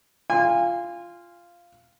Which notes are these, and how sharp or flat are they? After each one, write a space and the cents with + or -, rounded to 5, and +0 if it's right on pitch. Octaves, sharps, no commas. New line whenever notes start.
F4 -10 G#5 -30